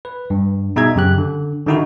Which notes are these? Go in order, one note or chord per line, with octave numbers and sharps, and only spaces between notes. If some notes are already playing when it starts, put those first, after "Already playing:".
B4
G2
B2 D#4 G#4 E5 A#5 G#6
F#2 C#3 G4 F#6
D3
D3 D#3 D#4 E4 F#4